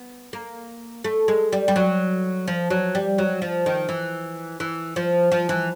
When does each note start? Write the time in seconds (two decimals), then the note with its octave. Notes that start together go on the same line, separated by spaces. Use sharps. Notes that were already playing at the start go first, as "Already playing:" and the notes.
Already playing: B3
0.33 A#3
1.04 A3
1.28 G#3
1.52 G3
1.68 G3
1.76 F#3
2.48 F3
2.70 F#3
2.95 G3
3.18 F#3
3.42 F3
3.66 D#3
3.89 E3
4.60 E3
4.96 F3
5.32 F3
5.49 E3